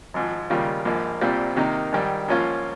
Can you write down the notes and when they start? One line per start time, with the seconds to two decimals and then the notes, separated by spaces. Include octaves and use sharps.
0.14 G#1 G#2 F3
0.50 D#2 C#3 G3 A#3 F4
0.85 A#1 G#2 F3 A#3
1.21 C2 A#2 G3 C4 F4
1.56 C3 D#3 A#3 D#4
1.93 G#2 D#3 G3
2.28 G#2 F3 A#3 C#4 F4